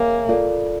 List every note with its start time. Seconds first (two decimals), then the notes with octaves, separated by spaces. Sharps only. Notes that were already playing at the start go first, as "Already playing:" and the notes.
Already playing: A#3 G#4 C#5 E5 G#5
0.29 F4 A4 D5